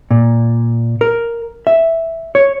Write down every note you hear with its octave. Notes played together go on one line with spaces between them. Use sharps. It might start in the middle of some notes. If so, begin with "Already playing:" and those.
A#2
A#4
E5
C#5